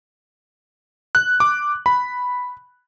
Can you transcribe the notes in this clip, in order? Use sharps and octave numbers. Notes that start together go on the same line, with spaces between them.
F#6
D6
B5